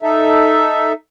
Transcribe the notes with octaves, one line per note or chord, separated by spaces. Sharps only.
D#4 A4 E5